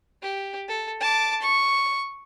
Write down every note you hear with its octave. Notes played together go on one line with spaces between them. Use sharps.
G4
A4
A5 D6
C#6